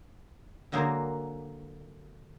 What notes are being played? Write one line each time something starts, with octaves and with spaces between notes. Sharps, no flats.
D3 F#3 A#3 G#4 C5